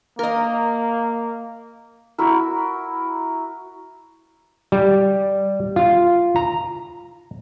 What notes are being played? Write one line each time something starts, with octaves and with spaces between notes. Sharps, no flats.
A#3 A#4 D#5
E4 F#4 A#4
G3
F4
A#5